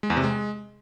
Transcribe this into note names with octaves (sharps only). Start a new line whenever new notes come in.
G#3
E2
C3
G#3